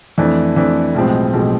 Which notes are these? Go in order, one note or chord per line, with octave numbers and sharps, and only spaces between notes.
F2 E3 A3 D4
F2 E3 A3 D4
B1 A2 F3 G#3 C4
B1 A2 F3 G#3 C4